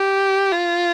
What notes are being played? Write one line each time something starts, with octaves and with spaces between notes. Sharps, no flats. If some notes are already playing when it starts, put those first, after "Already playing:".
Already playing: G4
F4